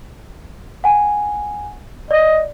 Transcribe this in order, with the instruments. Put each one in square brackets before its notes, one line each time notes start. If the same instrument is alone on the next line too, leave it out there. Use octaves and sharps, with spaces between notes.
[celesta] F#5 G#5
[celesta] D5 [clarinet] D#5